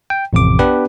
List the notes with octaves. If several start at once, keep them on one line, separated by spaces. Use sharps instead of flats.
G5
A1 F2 C3 D6
B3 D4 G4 B4